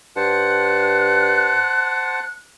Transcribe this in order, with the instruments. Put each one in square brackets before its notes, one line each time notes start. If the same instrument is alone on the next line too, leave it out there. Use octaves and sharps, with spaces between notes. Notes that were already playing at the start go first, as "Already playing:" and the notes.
[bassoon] G2 [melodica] C5 F#5 A5 [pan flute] F#6